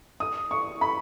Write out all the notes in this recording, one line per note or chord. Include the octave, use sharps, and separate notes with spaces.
D#6
C#6
B5